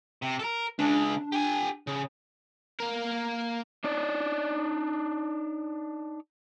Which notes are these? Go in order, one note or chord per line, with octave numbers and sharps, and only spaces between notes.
C3
A4 A#4
C#2 C#3 D4
G4 G#5
C#3
A#3 A#4
D4 D#4 C#5 D5